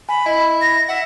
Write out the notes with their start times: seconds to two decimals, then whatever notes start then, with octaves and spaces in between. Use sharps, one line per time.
0.09 G#5 B5
0.26 E4 D#5
0.61 A#6
0.89 E5 F#5